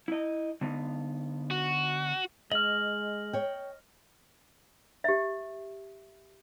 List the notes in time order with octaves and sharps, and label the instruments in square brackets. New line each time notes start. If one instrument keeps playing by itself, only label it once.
[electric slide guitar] E4 D#5
D3 B3 D#4
[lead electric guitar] F#4
[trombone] G#3 [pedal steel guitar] D#5 F6 [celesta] F#7
[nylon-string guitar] C#5 G5
[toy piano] G4 E5